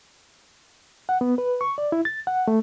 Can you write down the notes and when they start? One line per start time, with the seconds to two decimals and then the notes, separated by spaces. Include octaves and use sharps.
1.09 F#5
1.21 B3
1.38 B4
1.61 C#6
1.78 D5
1.92 E4
2.05 A6
2.27 F#5
2.48 A3